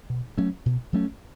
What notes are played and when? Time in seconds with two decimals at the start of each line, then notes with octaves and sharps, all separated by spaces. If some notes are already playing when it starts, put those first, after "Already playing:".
0.10 B2
0.38 F#3 A3 C#4
0.66 B2
0.93 F#3 A3 C#4